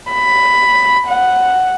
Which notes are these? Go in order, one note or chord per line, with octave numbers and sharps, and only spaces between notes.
B5
F#5